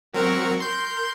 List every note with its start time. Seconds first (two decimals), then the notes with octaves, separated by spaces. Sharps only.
0.14 F#3 C4 F#4 A#4 C#6
0.60 A#4 C6 G6